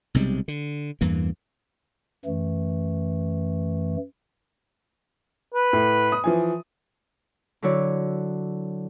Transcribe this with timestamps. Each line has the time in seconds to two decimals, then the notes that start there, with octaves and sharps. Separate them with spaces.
0.14 B1 C3 G3 G#3
0.48 D3
1.01 E2 G2 E3 A#3
2.26 F#2 E3 A3
5.54 B4
5.73 A2
6.12 D#6
6.24 E3 F3 G#5
7.62 D3 F#3 D4 E4 C#5 D5